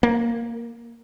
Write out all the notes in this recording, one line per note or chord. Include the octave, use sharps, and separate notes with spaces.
A#3